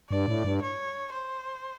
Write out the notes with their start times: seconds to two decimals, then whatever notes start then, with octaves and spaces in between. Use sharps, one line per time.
0.10 G2 D5
0.28 A2
0.44 G2
0.61 C#5
1.12 C5